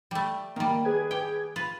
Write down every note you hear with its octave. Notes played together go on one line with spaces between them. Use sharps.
G3 A3
D#3 G3 A#3
G#4 B4 G#6
G4 G5
F4 B4